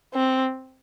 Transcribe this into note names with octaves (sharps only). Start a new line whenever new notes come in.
C4